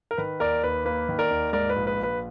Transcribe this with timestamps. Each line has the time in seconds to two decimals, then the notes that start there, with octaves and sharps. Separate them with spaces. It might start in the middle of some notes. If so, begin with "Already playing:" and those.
0.11 A#4
0.18 D#3 B4
0.40 D#2 A#4 D5
0.63 D#2 B4
0.85 A#3 B4
1.09 D#3
1.19 A#4 D5
1.31 D#2
1.53 G#2 A#4 D5
1.70 B4
1.76 A#1
1.87 B4
1.98 A#1
2.03 B4